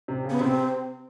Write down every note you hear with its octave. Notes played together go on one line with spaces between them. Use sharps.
C3
C#3
B3
C3 C4